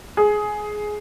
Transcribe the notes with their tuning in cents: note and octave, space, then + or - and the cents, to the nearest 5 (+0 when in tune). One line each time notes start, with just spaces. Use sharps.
G#4 +10